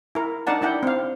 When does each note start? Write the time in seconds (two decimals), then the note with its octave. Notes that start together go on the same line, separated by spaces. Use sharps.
0.15 E4 A#4
0.47 D4 D#4 A#4 D5 F#5 A5
0.62 D4 E4 D5 F#5 G5
0.83 C4 F5